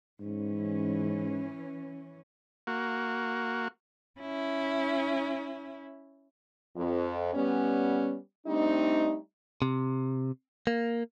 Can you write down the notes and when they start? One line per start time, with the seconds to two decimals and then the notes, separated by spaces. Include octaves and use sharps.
0.20 G#2 E3 C#4
2.67 A#3 F#4
4.20 C#4 E4
6.76 F2
7.34 G3 B3 C#4
8.47 G3 A3 C4 D4 D#4
9.62 C3
10.67 A#3